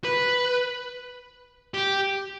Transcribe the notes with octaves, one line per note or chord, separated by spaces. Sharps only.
B4
G4